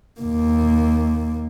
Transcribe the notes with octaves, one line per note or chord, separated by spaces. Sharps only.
D#2 A#3